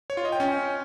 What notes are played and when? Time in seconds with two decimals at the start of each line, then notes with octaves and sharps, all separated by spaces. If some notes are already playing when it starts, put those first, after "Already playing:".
0.10 C#5
0.17 F4
0.25 D#5
0.32 G5
0.40 C#4